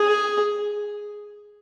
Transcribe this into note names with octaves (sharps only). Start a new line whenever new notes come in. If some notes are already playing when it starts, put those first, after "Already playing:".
Already playing: G#4